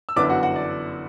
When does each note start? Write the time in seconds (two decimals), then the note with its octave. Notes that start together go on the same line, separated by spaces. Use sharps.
0.09 E6
0.16 G1 F#2 E3 B3 D4 D5 D6
0.29 F#4 F#5
0.43 F#4 F#5
0.56 D5